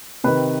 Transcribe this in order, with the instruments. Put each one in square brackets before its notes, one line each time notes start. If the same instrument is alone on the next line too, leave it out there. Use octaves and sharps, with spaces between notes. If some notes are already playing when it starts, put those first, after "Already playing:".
[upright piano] C3 D#3 B4